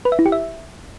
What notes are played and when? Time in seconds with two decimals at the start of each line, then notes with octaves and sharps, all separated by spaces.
0.05 B4
0.12 E5
0.19 E4
0.26 G4
0.32 E5